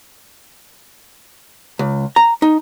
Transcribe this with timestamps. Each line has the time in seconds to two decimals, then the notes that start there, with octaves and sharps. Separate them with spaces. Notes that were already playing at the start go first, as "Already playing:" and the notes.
1.79 C#2
2.16 A#5
2.42 D#4